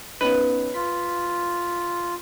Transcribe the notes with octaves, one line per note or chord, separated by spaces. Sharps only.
B3 C#4 D#4 B4
F4 B6